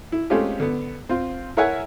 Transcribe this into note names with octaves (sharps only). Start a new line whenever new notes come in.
E4
G#3 A3 C4 C#4 F4 G4
D3 B3
C4 F4
E4 A#4 C#5 E5 F#5 G#5